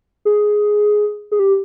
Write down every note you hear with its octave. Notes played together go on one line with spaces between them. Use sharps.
G#4
G#4
G4